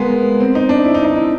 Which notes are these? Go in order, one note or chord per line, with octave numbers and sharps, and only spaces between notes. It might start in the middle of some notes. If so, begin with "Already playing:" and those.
Already playing: G#3 A#3 B3
C4
D#4
D4
E4
D#4
D#4
E4